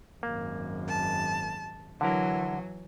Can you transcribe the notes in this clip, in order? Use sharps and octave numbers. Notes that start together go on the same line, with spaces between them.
G#1 F#2 A#3
A5
D3 E3 F#3 E4 A#4